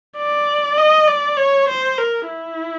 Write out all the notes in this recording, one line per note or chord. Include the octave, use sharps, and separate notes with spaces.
D5
D#5
D5
C#5
C5
A#4
E4